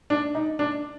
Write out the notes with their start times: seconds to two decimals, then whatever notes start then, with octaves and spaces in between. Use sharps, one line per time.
0.10 D4
0.35 D#4
0.59 D4